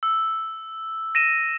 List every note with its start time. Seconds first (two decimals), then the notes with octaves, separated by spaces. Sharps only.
0.03 E6
1.15 A#6 D#7 E7